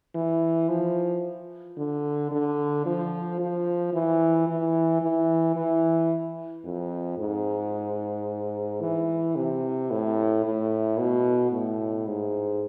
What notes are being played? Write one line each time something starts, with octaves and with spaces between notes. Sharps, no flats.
E3
F3
D3
D3
F3
F3
E3
E3
E3
E3
F2
G#2
E3
C3
A2
A2
B2
A2
G#2